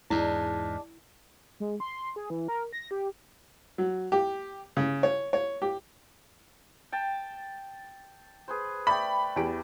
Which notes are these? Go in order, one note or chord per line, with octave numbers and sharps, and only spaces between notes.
E2 G#2 G#3 D4 E4
G#3
C6
G#4
E3
A#4
A#6
G4
F#3
G4
C#3
C#5
C#5
G4
G5 A5
G#4 B4 C5
A3 D5 G5 B5
E2 G4 D7